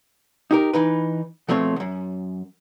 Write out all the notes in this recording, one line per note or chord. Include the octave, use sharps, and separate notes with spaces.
D#4 G4 A#4
E3 D#4 B4
B2 F3 A3 C4 C#5
B1 F#2